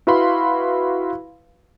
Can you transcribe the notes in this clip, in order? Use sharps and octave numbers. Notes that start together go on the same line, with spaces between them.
E4 F#4 B4 F5 B5 C6